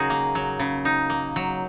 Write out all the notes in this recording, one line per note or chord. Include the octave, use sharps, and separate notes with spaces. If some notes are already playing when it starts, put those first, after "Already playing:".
Already playing: C#3 F#3 D#4 F#4 G#4 A#4
A#3
F#3
C#3
D#4
A#3
F#3